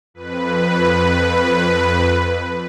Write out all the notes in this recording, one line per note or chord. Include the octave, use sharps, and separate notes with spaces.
F2 B4